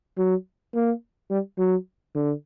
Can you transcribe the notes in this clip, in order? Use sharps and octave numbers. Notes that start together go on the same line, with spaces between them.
F#3
A#3
G3
F#3
D3